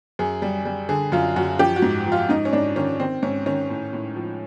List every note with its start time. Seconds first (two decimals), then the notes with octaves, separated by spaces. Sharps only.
0.19 F#2 G#4
0.42 G3
0.65 G3
0.89 D3 G#4
1.12 F#2 F4
1.36 F#2 F#4
1.59 F3 G4
1.76 F#4
1.82 G#2
2.07 F3
2.12 F4
2.29 G#2 D#4
2.45 C#4
2.53 G#2 D4
2.76 D#3 C#4
3.00 D#3 C4
3.23 G#2 C#4
3.46 D#3 C#4
3.70 A2
3.93 A2
4.16 F3